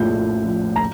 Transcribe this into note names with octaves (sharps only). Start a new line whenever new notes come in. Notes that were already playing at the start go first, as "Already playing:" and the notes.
Already playing: A#1 A2 G6
A3
F3
A#5